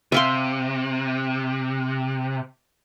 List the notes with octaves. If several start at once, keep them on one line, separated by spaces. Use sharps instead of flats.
C3 E5 F5 C6